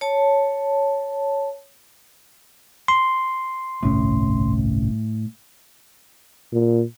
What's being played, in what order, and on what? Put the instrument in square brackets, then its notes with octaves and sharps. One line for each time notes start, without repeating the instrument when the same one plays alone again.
[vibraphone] C#5 A5
[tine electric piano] C6
[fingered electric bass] G1 C2 C#4 [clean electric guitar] A2
[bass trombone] A#2